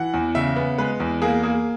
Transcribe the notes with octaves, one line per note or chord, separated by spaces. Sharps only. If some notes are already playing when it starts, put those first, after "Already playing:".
Already playing: E3 F#5
E2
C#3 E5
B3
G#3 B4
E2
A#3 G#4
A#3 G#4